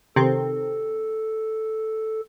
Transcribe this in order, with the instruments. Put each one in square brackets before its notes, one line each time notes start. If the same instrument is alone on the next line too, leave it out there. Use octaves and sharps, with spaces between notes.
[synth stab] C3 D#3 C4 [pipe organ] A4